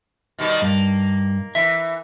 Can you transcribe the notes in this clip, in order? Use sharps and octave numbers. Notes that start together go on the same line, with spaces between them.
B2 D#3 G3
G2 A#3
E3 E5